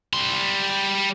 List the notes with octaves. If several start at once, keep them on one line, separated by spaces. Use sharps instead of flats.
G3 C6